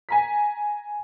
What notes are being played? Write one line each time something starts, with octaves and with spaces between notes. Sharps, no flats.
G#5 A#5 B6